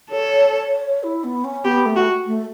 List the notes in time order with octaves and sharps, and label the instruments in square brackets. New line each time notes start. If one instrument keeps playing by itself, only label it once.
[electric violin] A4 [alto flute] C#5
[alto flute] E4
B3
C#4
[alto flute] B3 [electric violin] G4
[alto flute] A3
[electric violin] F#4
[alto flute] A3